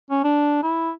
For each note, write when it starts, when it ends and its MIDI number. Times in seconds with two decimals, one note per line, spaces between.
0.11 0.21 61
0.24 0.62 62
0.63 0.91 64